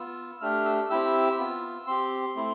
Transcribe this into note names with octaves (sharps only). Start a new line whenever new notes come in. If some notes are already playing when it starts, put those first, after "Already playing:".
Already playing: B3 F4 E6
A3 D4 G4 F6
E6
C4 E4 G4 E6
B3 F4
C4 G4 C6
A3 C4 E4